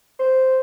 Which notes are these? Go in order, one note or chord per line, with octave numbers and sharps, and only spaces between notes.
C5